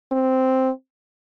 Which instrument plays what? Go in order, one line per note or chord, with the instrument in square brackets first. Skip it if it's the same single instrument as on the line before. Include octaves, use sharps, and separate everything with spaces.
[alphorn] C4